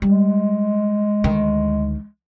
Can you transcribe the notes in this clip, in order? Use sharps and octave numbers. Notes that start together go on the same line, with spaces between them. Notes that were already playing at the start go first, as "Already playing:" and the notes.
G3 G#3
D2 D#3